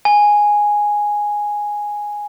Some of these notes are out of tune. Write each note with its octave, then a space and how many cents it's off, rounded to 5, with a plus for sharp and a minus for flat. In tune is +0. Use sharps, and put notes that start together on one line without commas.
G#5 +0